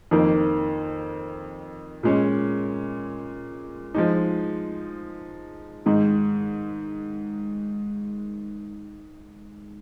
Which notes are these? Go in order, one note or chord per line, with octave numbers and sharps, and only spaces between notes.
F2 D#3 A#3 D#4
A#2 G#3 C#4
F3 G#3 D#4
G#2 D#3 G#3 D#4